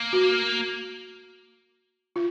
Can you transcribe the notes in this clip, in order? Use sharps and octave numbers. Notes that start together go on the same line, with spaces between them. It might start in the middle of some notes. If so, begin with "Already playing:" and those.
Already playing: A#3
F#4
F4